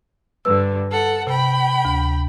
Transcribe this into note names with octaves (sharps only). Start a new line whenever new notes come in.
G2 D3 B4 E6
A4 F#5
C3 G5 B5
D2